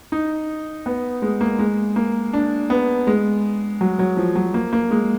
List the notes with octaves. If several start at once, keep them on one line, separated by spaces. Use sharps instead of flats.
D#4
B3
G#3
A#3
G#3
A#3
D4
B3
G#3
F#3
F#3
F3
F#3
A#3
A#3
G#3